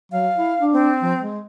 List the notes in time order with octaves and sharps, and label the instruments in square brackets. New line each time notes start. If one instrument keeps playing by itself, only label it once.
[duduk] F#3 [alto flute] F5
[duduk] E4
D4
[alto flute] C4
[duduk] F3
G#3